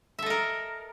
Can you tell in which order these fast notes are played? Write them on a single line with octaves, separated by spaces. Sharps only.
E5 A4 D#5 A#4